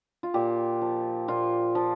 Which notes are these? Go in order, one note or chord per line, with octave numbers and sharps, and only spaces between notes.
F4
A#2 G4
F3
A#2 F4
F3